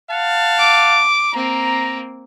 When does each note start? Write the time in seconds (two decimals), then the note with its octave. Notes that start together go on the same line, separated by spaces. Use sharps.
0.10 F5 F#5 A5
0.58 D6
1.33 A#3 C4 A#5